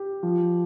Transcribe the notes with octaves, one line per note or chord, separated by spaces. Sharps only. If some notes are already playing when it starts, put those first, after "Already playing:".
Already playing: G4
F3